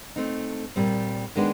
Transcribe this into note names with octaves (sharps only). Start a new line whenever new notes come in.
A3 C4 D#4
A#2 G3 C4
D#3 G#3 B3 D4